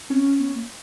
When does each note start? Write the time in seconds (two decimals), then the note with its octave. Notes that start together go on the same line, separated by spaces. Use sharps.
0.10 C4 C#4
0.39 B3
0.54 A#3